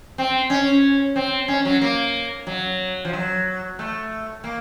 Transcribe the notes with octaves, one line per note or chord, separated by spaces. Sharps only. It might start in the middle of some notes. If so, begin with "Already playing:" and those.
C4
C#4
C4
C#4
F#3
A#3
F#3
F3
F#3
A3
A#3